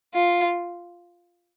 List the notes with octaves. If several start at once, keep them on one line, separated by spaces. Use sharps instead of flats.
F4